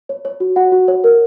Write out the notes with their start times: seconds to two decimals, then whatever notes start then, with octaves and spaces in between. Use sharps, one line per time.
0.09 C#5
0.25 C#5
0.40 F#4
0.56 F#4 F#5
0.72 F#4
0.88 C#5
1.04 A#4